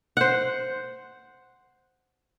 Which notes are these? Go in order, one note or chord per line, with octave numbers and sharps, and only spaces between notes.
C5 F#5